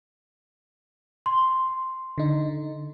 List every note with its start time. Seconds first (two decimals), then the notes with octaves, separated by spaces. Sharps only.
1.26 C6
2.18 D3 D#4